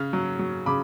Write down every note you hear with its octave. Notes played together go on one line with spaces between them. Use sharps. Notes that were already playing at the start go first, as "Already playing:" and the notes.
Already playing: C#3 F6
F#3
F#3
C#3 B5 D6